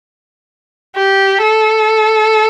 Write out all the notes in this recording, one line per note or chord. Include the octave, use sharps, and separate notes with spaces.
G4
A4